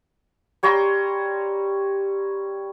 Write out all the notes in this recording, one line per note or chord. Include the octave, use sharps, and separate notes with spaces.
G3 C#5 A#5 C6